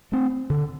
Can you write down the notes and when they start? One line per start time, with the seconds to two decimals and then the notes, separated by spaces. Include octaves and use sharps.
0.12 A3 C4
0.50 D3